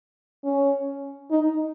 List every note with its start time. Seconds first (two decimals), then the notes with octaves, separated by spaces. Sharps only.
0.44 C#4
1.31 D#4